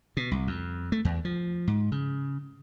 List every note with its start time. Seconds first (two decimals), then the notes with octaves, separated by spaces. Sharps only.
0.17 B2
0.31 C2
0.47 F2
0.92 A3
1.05 E2
1.25 F3
1.67 G#2
1.92 C#3